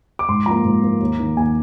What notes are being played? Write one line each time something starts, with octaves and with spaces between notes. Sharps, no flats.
D6
G#2 C6
F3 A#3 A#5
G#2
F3 A#3
D#2
D#3 A#3
D#2 G#5